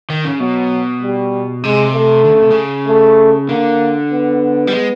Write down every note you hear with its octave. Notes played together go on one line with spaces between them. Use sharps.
D#3
C#3
B2 F#3
G3
C3 G#3
A3
D3
C#3
C3
C#3
A3
D3 A#3
B3
G3
G#3